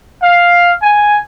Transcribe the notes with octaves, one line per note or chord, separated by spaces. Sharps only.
F5
G#5